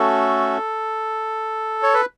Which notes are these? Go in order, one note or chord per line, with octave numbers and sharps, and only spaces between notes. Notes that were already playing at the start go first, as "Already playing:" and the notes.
Already playing: A3 C#4 F#4 A4
C#5
B4